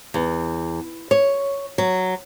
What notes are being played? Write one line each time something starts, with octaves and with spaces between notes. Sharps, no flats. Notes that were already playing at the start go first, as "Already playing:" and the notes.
E2
C#5
F#3